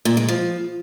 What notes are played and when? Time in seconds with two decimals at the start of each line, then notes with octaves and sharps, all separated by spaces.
0.05 A#2
0.17 G#3
0.28 F3